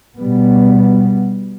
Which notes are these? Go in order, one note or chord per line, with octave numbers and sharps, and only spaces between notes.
B2 G3 B3